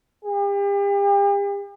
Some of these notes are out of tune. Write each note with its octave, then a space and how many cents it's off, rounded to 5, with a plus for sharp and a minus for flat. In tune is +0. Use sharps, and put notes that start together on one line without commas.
G4 +40